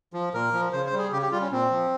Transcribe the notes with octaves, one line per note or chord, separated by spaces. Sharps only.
F3
A#2 A#4
F3
C#3 C5
C5
G3
G#4
C#3 G4
G4
G3 F4
C#4
A#2 C4
F3